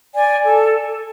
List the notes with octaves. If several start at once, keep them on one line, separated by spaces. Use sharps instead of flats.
D5 G#5
A4